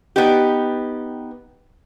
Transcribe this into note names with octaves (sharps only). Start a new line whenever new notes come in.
B3 D#4 G4